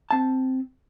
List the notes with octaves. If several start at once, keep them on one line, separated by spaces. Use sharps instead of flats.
C4 A5